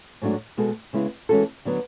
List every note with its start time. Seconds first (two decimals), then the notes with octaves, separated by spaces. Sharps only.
0.22 G#2 F#3 A3 D4 F#4
0.57 B2 G#3 B3 F#4 A4
0.93 C#3 G#3 B3 E4
1.29 E3 G#3 C#4 F#4 A4
1.65 D3 F#3 B3